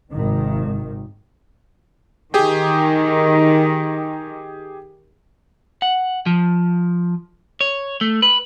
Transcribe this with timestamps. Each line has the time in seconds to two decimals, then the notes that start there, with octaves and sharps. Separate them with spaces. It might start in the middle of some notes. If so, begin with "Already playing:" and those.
0.13 G#1 C3 D#3
2.34 D#3 G4 G#4 G5
5.82 F#5
6.26 F3
7.61 C#5
8.01 A3
8.22 B4